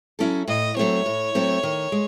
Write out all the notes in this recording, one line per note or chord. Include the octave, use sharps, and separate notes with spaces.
F#3 C#4 E4 A4
A2 D#5
F#3 A3 C4 C#5
A2
F#3 A3 C4
D#3
G#3